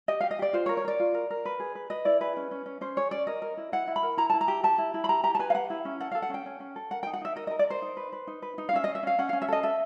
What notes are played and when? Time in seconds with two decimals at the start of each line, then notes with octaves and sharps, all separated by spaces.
0.08 G4 D#5
0.21 G4 F5
0.31 D#5
0.39 G4 D5
0.53 F4 C5
0.66 C#5
0.69 A#4
0.77 C#5
0.85 A#4 D5
1.00 F4
1.14 A#4
1.30 A#4
1.45 B4
1.60 G#4
1.75 B4
1.90 B4 D#5
2.05 E4 D5
2.20 G#4 B4
2.37 C#4
2.51 C#4
2.66 C#4
2.81 C#4 C5
2.97 G#4 C#5
3.11 C#4 D5
3.27 A#4 D#5
3.42 A#4
3.57 E4
3.72 E4 F#5
3.87 E4
3.96 B5
4.03 A#4
4.17 E4 A#5
4.30 E4 A5
4.41 A#5
4.48 G4
4.63 G4 A5
4.78 E4
4.94 E4
5.04 B5
5.09 G4 A#5
5.23 G4 A#5
5.35 A5
5.39 B4 G#5
5.50 F5
5.55 G4 F#5
5.70 E4
5.85 C#4
6.00 A4 F#5
6.11 A4 F5
6.22 F#5
6.30 C#4 G5
6.46 C#4
6.60 C#4
6.76 A4
6.91 A#4 F#5
7.03 D#4 G5
7.13 F#5
7.21 D#4 E5
7.36 A#4 D#5
7.47 A#4 D#5
7.59 D5
7.67 A#4 C5
7.82 D#4
7.97 B4
8.12 B4
8.27 D#4
8.42 B4
8.58 D#4
8.69 F5
8.73 C#4 E5
8.84 C#4 D#5
8.95 E5
9.03 C#4 F5
9.19 C#4 F#5
9.29 C#4 F5
9.42 E5
9.48 A4 D#5
9.63 A4 E5